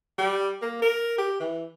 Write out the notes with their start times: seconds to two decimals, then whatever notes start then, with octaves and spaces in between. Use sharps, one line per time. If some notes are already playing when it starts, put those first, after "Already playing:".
0.18 G3
0.61 A#3
0.82 A#4
1.18 G4
1.40 E3